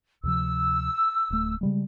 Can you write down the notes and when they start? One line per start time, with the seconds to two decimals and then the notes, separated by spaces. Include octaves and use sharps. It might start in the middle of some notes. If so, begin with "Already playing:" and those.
0.23 D2 C3 F3 E6
1.30 D1 A3
1.61 C#3 G3 G#3